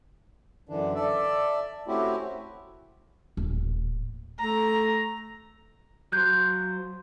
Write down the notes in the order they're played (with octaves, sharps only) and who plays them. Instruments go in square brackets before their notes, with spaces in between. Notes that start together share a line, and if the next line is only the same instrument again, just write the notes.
[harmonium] F#2 D3 E3 D4
A4 D5 E5
A3 C4 C#4 E4 F#4 G4
[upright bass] D#1 A1
[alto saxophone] A3 [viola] A#5
[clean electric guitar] F#3 C5 [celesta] F#6 G6